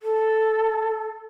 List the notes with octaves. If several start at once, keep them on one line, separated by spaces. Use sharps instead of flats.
A4